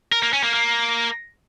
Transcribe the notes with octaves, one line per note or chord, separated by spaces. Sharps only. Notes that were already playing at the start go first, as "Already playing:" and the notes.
A#4
A#3
C#4
A#3
A#3